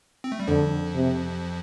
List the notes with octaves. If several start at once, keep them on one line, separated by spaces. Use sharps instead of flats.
C4
A3
G3
F2 D3 F3
C3